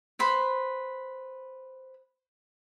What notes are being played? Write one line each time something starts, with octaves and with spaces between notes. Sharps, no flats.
B4 C5 B5